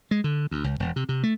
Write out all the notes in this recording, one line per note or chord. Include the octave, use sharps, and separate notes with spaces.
G#3
D3
D2
C#2
E1
C3
C3
A3